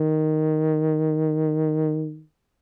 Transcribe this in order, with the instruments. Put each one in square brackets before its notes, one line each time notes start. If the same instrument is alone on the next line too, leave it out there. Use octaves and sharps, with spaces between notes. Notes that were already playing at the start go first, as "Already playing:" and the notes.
Already playing: [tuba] D#3